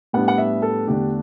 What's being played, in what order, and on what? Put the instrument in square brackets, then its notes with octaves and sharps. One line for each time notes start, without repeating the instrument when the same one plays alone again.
[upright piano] A2 G3 B3 D4 F#5
F#5
E5
A4
E2 D3 A3 D4 G4